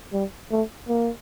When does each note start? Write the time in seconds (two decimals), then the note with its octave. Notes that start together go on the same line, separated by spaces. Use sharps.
0.13 G3
0.51 A3
0.88 A#3